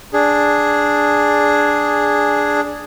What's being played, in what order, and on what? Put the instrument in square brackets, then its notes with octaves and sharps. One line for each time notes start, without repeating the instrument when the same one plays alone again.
[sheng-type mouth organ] D4 G#4